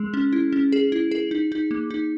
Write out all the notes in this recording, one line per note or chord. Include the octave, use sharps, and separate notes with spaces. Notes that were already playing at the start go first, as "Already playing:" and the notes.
Already playing: G#3 G#4
C#4
E4
C#4
G#4
E4
G#4
D#4
D#4
A#3
D#4